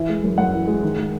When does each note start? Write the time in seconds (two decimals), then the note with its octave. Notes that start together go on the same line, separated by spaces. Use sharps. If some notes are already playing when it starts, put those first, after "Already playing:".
Already playing: E3 E5
0.09 G#3
0.23 F#2
0.38 F#2 F#5
0.53 E3
0.67 G#3
0.83 D#3
0.97 G#3